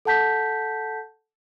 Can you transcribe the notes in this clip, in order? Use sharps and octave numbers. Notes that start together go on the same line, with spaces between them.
A4 F#5 A5 G6 B6